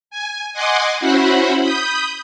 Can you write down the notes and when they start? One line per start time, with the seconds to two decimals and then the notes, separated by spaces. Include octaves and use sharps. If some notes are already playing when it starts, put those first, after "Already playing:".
0.11 G#5
0.53 D#5 F#5 G#5 C6 D6
1.00 C#4 E4 F#4 C5 F#5 B5
1.63 B5 D#6 G6